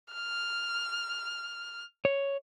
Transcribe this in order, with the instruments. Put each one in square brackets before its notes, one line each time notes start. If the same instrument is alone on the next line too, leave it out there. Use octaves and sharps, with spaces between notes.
[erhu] F6
[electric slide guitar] C#5